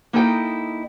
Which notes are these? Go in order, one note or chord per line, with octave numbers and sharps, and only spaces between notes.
A#3 D#4 E4 A4 D#5 G5